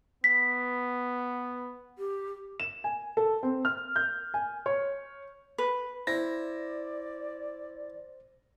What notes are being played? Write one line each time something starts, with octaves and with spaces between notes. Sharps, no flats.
B3 B6
G4
E7
G#5
A4
C4
F6
G6
G#5
C#5
B4
E4 C5 D5 A#6